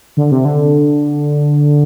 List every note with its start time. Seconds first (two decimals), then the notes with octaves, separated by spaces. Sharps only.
0.17 D3
0.31 C3
0.45 D3